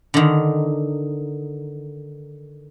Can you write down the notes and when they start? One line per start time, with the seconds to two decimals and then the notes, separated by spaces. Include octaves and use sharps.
0.14 D3 D#3